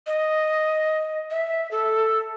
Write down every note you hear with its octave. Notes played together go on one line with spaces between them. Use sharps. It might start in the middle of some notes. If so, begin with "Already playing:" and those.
D#5
E5
A4